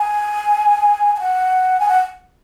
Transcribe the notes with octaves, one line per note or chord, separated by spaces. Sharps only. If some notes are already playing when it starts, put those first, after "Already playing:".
Already playing: G#5
G#5
F#5
G#5
F#5